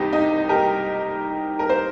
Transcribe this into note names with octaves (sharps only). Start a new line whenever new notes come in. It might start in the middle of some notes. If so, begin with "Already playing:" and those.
Already playing: C2 C3 D#3 G3 D#4 G4
D#4
G4 A#4
A#4
C5